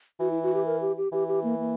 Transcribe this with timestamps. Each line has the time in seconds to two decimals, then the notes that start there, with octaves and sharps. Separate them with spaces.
0.20 E3 F#4
0.31 E4
0.43 F#4
0.54 G4
0.66 A#4
0.81 G4
0.98 G4
1.12 E3 G4
1.28 G4
1.44 A#3
1.59 A#3